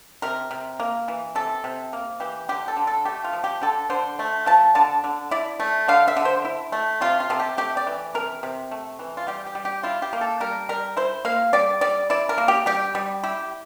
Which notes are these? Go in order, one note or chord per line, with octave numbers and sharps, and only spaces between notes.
C3 A#4
C3
A#3
E3
C3 A4
C3
A#3
E3 G4
D3 G4
A4
D3
A4
A3 G4
F4
F3
G4
D3 A4
D3 C5
A3
F3 A5
D3 A5
D3
E4 D5
A3
D3 F5
E5
D3
C5
E4
A3
C3 F4
F4
C3 A4
G4
A3 G4
D5
E3
C3 A#4
C3
A3
E3
F4
G3 G4
G4
G3
G4
E4 F4
G4
A#3
A4
G3 A#4
G3 A#4
E4 C5
A#3 F5
G3 D5
G3 D5
E4 D5
A#4
A#3
G4
G3 G4
G3
E4 G4